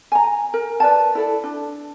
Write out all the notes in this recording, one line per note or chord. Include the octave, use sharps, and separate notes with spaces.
G#5 A#5
A#4
B4 D5 A5
E4 A4 D5
D4